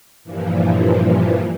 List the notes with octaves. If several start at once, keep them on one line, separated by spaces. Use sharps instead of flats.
G2 A#2 E3 F3